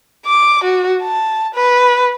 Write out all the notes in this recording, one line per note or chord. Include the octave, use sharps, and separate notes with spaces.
D6
F#4
A5
B4